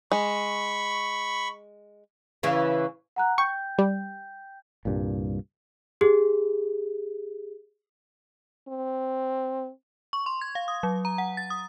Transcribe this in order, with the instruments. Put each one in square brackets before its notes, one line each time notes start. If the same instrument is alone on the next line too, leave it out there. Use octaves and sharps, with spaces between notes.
[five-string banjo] G#3 [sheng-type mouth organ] B5 C#6
[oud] C#3 E3
[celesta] F#5 A#5 F#6
[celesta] G5 G6 [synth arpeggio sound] C#6
[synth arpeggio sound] G3
[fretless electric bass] C2 G2 A#2
[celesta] G4 G#4
[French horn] C4
[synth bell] C#6
C6
G#6
F5
D#6
F#3
A#5
F#5
A6
D#6